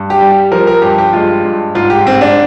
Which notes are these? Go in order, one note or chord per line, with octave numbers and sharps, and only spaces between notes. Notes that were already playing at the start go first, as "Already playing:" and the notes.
Already playing: G2
G4
G3
G4
F3 A#4
A#4
G2 G4
G4
G#3 F4
G2
G#2 F4
G4
G#2 C4
D4